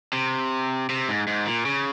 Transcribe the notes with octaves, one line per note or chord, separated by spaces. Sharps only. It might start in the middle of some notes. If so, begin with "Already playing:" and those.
C3
C3
G#2
G#2
A#2
C#3